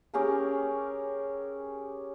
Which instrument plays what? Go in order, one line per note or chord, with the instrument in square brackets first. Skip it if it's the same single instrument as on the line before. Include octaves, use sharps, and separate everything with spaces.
[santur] C#4 G4 G#4 A#4